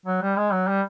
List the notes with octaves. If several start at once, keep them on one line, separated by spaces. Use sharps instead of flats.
F#3
G3
G#3
F#3
G3